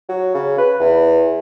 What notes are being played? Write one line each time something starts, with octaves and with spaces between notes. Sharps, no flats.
F#3
C#3
B4
E2